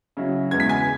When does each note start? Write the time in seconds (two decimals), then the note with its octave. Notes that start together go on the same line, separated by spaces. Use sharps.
0.17 C#3 F#3 E4
0.51 E2 C#3 E3 G#3 B3 G#6
0.60 B6
0.69 G#5 G#6